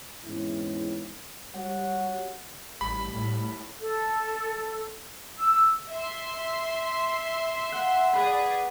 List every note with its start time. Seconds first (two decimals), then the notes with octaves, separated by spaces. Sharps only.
0.24 E2 G#2 E3 C4 C#4 E4
1.54 G3 F#4 C#5 F#5
2.81 A1 G3 B5
3.13 A2
3.80 A4
5.40 E6
5.91 E5 C6
7.72 F#5
8.13 G#4 B4 D5 B5